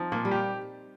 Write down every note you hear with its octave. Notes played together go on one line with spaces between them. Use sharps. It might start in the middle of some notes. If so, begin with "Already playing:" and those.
Already playing: F3 C4 D#4
A#2 A#3
G3
G4